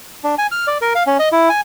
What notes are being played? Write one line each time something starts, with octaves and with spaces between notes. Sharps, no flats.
D4
G#5
F6
D5
A#4
F5
C#4
D#5
E4
G#5